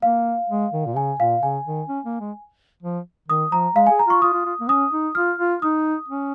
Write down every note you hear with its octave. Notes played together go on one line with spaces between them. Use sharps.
A#3 F5
G#3
D#3
A#2
C#3 G#5
A#2 F5
C#3 G#5
D#3
C#4
A#3
G#3
F3
D#3 D#6
F3 A#5
G#3 F5
G#4 G#5
A#5
F4 C#6
F4 D#6
F4
F4
A#3
C#4 D#6
D#4
F4 F6
F4
D#4 D#6
C#4